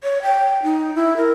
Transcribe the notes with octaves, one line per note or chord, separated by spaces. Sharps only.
C#5
G5
D#4
E4
A#4